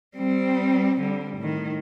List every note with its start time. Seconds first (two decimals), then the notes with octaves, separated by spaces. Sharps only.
0.17 G3 C4
1.00 D3 G3
1.37 A2 D#3